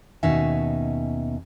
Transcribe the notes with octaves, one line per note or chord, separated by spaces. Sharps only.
D#2 B2 C#4 D#4 E5 G#5